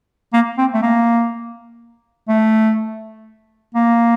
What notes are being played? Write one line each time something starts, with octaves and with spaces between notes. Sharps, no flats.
A#3
C4
A3
A#3
A3
A#3